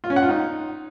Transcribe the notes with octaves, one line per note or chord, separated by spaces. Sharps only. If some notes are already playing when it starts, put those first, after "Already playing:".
F4
C#4
F#5
F4
D#4